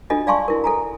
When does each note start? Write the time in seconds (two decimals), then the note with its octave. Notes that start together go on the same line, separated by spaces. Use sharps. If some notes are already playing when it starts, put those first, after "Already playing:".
0.10 D4 F4 A4 D#5 G#5
0.27 D5 F5 G#5 A5 C6 C#6
0.48 E4 A#4
0.64 A4 G#5 A#5